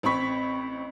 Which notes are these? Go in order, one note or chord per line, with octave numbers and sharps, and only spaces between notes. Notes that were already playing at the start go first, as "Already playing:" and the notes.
A1 C4 B5 C#6 B6